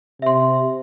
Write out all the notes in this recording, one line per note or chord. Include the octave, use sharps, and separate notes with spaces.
C3 E5 C6